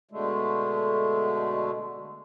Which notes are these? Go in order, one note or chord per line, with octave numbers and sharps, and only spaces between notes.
B2 D3 G#3 A3